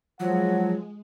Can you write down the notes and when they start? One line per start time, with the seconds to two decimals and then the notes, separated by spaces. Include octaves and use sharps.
0.20 F3 F#3 G#3 F#5